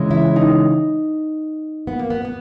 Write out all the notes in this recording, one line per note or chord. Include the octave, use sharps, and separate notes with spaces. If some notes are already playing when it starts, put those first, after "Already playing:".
Already playing: C#3 E3 G#3
E4
D#4
B3
A#3
B3
B3